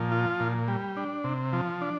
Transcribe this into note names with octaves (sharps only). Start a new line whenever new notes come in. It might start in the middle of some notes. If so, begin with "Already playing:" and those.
Already playing: A#2 F3
F4
A#2
G3
D4
C3
F3
D4